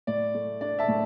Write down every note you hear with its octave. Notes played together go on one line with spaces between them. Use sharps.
A2 D5
A3
D4 D5
E5 A5
A2